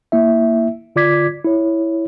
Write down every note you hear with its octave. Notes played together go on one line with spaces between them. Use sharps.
A#3 E4 E5
D3 F4 D5 D6 G#6 B6
E4 C#5